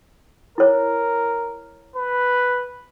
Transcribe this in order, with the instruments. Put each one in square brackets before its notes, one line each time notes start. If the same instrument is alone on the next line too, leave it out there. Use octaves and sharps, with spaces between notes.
[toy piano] E4 C#5 [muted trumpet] A#4
[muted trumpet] B4